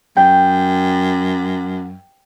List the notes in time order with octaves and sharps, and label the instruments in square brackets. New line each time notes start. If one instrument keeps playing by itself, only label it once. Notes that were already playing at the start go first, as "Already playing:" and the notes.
[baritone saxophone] F#2 [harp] G5